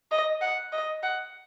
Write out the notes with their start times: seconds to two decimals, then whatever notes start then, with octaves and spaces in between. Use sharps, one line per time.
0.11 D#5
0.41 F#5
0.72 D#5
1.03 F#5